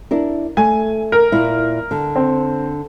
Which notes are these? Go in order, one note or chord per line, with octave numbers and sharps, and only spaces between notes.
D4 E4 A#4
A3 G#5
A#4
A#2 E4
D3
C4